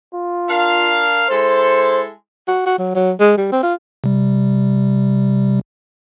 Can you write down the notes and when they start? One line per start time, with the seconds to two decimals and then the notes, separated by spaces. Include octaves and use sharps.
0.15 F4
0.48 D4 A#4 F5
1.29 G#3 E4 A4 C5
2.48 F#4
2.66 F#4
2.79 F#3
2.95 F#3
3.20 G#3
3.38 G3
3.52 C4
3.63 F4
4.04 C3 G3